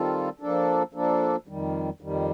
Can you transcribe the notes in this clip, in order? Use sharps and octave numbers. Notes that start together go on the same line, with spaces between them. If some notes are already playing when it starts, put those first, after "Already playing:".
Already playing: D#3 G3 C4 F4 A4
F3 A#3 D4 A4
F3 A#3 D4 A4
F2 D#3 G3
F2 D#3 G3